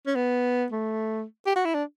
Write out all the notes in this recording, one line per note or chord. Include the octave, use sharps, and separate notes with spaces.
C#4
B3
A3
G4
F#4
E4
D4